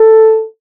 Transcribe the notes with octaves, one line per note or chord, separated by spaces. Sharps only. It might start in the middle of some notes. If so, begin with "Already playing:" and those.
Already playing: A4